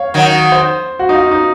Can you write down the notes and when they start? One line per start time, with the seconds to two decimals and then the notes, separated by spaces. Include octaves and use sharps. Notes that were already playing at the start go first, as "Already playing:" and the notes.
Already playing: C#5 F5
0.14 D#3 F#3
0.52 C5
0.99 F#4
1.09 D#4
1.15 F4
1.31 D#4